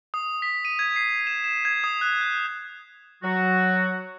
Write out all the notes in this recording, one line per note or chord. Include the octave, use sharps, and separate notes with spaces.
D#6
B6
D#7
G#6
C7
E7
E7
G#6
D#6
F#6
G6
F#3 F#4